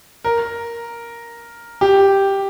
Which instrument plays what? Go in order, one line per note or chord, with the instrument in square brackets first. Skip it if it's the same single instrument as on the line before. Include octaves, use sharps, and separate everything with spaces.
[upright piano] A#4
G4